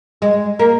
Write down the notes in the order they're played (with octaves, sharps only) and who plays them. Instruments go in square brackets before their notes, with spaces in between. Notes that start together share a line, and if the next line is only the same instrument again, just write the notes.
[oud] G#3
A#3